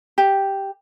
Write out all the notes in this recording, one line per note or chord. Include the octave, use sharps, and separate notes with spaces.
G4